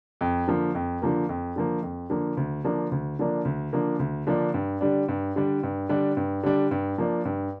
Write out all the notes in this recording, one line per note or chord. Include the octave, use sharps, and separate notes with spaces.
F2
D3 F3 A#3
F2
D3 F3 A#3
F2
D3 F3 A#3
F2
D3 F3 A#3
D2
D3 F3 A#3 D4
D2
D3 F3 A#3 D4
D2
D3 F3 A#3 D4
D2
D3 F3 A#3 D4
G2
D3 G3 D4
G2
D3 G3 D4
G2
D3 G3 D4
G2
D3 G3 D4
G2
F3 A#3 D4
G2